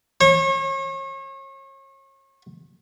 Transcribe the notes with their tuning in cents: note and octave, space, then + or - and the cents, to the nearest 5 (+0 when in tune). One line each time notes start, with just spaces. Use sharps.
C#5 -35